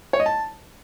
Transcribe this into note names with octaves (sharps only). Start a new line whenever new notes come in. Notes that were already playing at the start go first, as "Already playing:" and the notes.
C#5
D#5
A5